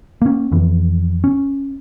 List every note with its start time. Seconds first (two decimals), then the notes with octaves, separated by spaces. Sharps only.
0.22 A#3 C#4
0.52 F2 E3
1.24 C#4